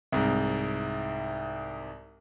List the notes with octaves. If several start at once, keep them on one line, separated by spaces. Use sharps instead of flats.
C2 G#2